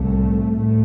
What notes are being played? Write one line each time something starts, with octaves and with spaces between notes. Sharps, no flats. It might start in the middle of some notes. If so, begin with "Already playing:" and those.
Already playing: C2 A2 C3 A3
D2 A2 A3